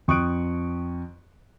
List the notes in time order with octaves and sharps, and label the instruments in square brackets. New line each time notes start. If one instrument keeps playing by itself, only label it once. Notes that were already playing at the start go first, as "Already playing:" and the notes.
[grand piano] F2 C#6 D#6 F#6 D7